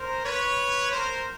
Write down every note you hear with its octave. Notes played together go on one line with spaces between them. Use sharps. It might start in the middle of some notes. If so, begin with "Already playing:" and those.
Already playing: A#4 C5
B4 C#5
A#4 C5